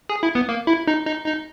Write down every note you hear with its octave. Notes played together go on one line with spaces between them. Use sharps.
G#4
E4
B3
A#3
E4
D#4
D#4
D#4